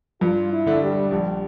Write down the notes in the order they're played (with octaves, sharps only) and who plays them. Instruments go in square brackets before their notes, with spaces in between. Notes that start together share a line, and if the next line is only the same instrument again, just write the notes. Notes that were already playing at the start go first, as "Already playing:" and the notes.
[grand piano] G2 [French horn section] F4
[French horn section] E4
[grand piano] D3 A3 D4
[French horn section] G3
[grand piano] A#1 [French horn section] G3